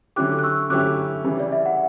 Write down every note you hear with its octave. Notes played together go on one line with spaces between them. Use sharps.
D3 F#3 C#4 E4 G4 D6 F#6
F#6
C#6 E6
D3 F#3 C#4 E4 G4 D6 F#6
C#3 E3 G3 C#4
D5
E5
F#5